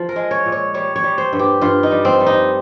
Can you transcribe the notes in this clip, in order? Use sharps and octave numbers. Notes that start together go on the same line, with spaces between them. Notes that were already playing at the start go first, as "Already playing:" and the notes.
Already playing: F3
A#4
G#3
C#5
A#2
C#5
G3 C#5
C#5
G3
C5
G2
G4
G2 F4
D#4
G3
C4
G3
D#4